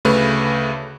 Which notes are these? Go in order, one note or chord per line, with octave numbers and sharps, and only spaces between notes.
D2 C#3 A3 B4